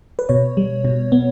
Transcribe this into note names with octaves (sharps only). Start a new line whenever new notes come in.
B4
B2 C#5
G3
B2
B3